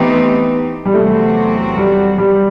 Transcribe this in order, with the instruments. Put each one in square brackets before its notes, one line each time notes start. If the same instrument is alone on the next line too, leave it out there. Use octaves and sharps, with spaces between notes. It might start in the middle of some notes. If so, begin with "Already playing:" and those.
Already playing: [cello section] E3 A3 C4 D#4 G4 [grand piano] B3
[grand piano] G3
[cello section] E2 C3 F#3 C4 F#4 [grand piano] A3
[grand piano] G3
G3